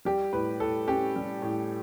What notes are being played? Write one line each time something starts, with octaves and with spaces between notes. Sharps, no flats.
G3 G4
A2 B4
A2 A4
C#4 G4
G3
A2